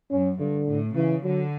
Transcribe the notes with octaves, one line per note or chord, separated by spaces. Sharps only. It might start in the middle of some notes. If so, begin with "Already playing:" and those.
F#2 C#4
G2 D3
A2
C#3 E3
D3 F#3